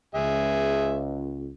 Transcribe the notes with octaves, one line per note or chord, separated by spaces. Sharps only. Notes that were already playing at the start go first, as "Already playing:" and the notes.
C#2 G#4 E5